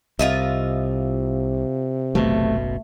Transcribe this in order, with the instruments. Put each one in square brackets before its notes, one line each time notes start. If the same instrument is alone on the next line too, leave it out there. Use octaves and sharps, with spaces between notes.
[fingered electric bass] C2 [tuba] C3 [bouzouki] F4 D#5 E5
[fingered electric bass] F#1 B1 B2 [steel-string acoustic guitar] A3